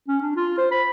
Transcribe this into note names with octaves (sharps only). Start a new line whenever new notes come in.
C#4
D4
F4
C5
B5